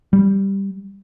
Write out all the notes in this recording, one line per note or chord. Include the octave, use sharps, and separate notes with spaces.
G3